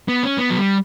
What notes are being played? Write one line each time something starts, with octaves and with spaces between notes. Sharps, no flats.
B3
C#4
B3
F#3
G3